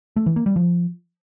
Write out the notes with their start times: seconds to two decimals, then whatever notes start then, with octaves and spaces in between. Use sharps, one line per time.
0.16 A3
0.26 E3
0.36 A#3
0.46 G3
0.56 F3